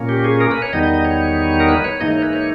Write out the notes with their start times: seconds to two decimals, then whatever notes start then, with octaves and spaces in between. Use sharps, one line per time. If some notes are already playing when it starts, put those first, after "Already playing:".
Already playing: A#2 A#3 C#4
0.09 G4
0.24 G#4
0.40 A#4
0.51 B4
0.62 C#5
0.73 E2 D#3 G3 B3 D#4 D#5
0.83 D#5
0.94 D#5
1.05 C#5
1.60 A#4
1.69 B4
1.84 C#5
2.00 G#2 E3 A#3 D#4 D#5
2.11 C#5
2.22 B4
2.33 C#5